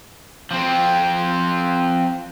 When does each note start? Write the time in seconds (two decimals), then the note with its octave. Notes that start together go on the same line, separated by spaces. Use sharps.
0.51 F3 C4